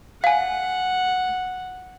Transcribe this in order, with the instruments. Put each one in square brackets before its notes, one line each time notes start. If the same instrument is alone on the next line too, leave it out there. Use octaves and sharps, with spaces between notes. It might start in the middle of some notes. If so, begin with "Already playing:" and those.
[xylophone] F5 G#5 [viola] F#5